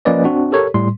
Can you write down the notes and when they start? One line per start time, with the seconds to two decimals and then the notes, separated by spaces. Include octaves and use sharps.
0.05 F3 A#3 C#4 B4 D5 D#5
0.24 C4 D4 F#4
0.52 G4 A4 A#4 C#5
0.74 A2 G3 C6